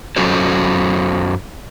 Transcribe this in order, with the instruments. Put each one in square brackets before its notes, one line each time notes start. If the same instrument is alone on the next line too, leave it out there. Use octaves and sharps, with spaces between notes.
[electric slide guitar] F#2 F#3 C#4 F#4 A4 C5